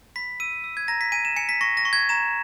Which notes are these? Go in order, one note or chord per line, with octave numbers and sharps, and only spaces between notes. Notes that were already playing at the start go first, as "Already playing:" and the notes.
B5 B6
E6 D#7
E6
G#6
A#5 A#6
B6
G#5 D#7
E7
G#5 C#7
B6
C#6 A#6
A#6
C#6
G#6
A#5 E7